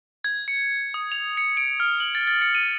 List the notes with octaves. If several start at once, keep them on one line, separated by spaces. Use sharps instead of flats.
G#6
C#7
D#6
F7
C#7
D7
F6
F#7
A6
A6
C#7
D#7